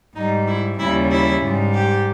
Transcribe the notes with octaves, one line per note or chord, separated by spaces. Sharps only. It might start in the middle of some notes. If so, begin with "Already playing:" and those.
G#2 G3 D#4
E4
D#2 C#3 G3 E4
E4
G#2 G3
G4